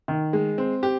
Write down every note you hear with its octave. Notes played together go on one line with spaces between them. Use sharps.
D#3
G#3
C4
G4